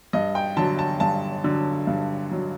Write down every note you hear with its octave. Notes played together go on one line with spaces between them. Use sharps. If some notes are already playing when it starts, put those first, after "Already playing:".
G2 D#5
G5
D3 F#3 A5
A5
G2 A5
D3 F#3
G2
D3 F#3